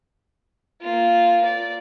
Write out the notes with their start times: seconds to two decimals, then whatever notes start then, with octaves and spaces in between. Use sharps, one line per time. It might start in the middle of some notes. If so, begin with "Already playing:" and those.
0.82 A#3 F4
1.46 D5